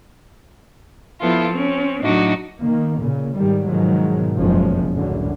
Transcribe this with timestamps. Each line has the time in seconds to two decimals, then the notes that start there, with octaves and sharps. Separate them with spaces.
1.20 F3 B3 E4 F4 A4
1.51 C4 C#4
2.02 A2 F#3 D4 D#4 F#4
2.60 D#3 A#3
2.99 A#2 C#3
3.34 G#2 D#3 G3
3.67 G#2 B2 D#3 F3 F#3 G#3
4.37 F#1 B1 F2 F3 G#3 C#4
4.91 C#2 F#2 A2 D3